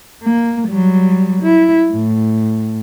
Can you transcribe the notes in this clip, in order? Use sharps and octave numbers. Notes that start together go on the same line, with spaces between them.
A#3
F#3 G3
E4
A2